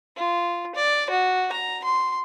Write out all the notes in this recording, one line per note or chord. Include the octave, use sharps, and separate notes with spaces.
F4
D5
F#4
A#5
C6